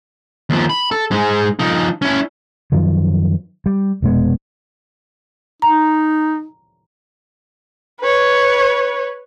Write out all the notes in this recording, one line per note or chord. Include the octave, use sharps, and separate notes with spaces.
D#2 F3
B5
A4
G#2 G#3
F3 D#4
C#4 E4
F#2 D#3 F3 F#3
G3
F1 B2 G#3 B3
D#4 A#5
B4 C#5